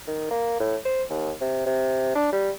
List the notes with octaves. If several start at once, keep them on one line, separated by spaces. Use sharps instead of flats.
D#3
A#3
A2
C5
D#2
C3
C3
D4
G3